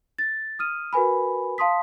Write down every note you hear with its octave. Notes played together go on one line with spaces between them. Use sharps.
A6
D#6 F6 D#7
F#4 A#4 B4 G#5 B5
F5 A5 C6 D#6 B6